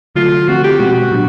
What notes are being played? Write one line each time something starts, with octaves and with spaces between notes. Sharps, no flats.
D3 F#3 A3 F4
D3 F3 A3 C4 F#4
G4
B2 G#3 B3 F#4
A#2 F#3 B3 D4